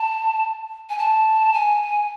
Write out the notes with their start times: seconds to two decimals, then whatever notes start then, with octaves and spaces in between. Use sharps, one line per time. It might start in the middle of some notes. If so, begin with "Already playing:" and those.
Already playing: A5
0.89 G#5
0.98 A5
1.53 G#5